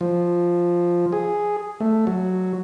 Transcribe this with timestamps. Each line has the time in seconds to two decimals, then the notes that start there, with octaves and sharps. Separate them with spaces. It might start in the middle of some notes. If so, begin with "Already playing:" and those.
0.01 F3
1.12 G#4
1.80 A3
2.07 F#3